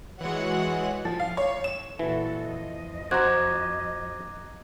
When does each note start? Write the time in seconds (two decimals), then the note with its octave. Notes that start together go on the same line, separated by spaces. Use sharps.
0.21 E3 G#3 F#4 C#5 F#5
1.05 F3
1.20 F5
1.37 C#5
1.64 E7
1.99 A#2 E3 F#4 A4
2.41 F2 F3 D#5
3.11 C4 F#4 C5 A#5 D6 F#6 G#6